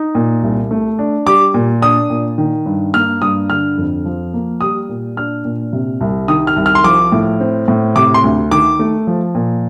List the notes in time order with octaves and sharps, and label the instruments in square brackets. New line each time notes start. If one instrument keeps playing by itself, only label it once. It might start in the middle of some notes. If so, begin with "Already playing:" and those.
Already playing: [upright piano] D#4
A#2
C2
A3
D4
G3 D6
A#2
D4 D#6
A#2
D#3
G2
A#3 F6
G2 D#6
D3 F6
F2
F3
A#3
G3 D#6
A#2
D4 F6
A#2
C3
C2
D#3 D#6
F6
C2
F6
C6
F3 D6
A2
C4
A2
C3 D6
C6
D2
D#3 D6
A3
F3
A#2